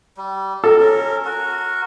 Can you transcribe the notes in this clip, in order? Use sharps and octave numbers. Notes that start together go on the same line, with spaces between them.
G3
A4 A#4
C#4 A#4
F#4 A#4